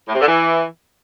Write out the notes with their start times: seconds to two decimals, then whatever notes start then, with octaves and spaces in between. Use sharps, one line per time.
0.08 A2
0.15 C3
0.21 D3
0.27 E3